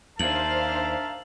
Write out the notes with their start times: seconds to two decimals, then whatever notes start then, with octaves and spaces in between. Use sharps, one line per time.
0.19 D#2 D4 A#4 C5 E5 F5 A5 F#7